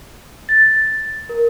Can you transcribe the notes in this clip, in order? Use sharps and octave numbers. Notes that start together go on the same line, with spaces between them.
A6
A#4